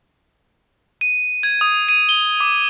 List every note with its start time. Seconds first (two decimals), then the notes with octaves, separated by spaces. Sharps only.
1.01 D#7
1.43 G#6
1.61 D#6
1.89 D#7
2.09 G7
2.40 D6